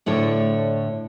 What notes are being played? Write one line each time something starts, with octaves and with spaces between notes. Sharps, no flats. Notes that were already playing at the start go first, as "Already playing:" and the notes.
D2 A2 D3 C#5